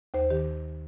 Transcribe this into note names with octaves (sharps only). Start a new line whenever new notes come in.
D#2 C5
D#3 G4